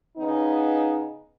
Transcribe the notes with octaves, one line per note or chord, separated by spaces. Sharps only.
C#3 B3 D#4